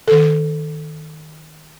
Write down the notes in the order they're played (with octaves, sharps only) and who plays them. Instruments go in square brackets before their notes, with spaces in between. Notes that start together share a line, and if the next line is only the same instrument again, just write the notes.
[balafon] D#3 A4